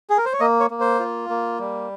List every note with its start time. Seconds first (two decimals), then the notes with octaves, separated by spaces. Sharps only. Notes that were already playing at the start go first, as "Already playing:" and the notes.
0.10 G#4
0.18 A#4
0.25 C5
0.33 C#5
0.40 A#3 D#5
0.60 C#5
0.71 A#3
0.80 C5
1.00 F4
1.29 A#3
1.59 G3